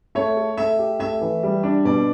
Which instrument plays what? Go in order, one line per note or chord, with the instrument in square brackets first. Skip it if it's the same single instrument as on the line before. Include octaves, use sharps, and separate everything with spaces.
[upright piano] A3 [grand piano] C#5
[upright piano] A4
[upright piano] A3 [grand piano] E5
[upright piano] G4
[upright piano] A3 [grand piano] E5
[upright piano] E3
G3
D4
[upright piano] B2 [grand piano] D5